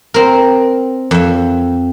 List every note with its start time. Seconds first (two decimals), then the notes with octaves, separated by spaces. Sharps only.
0.14 C4 A#4
1.11 F2 E5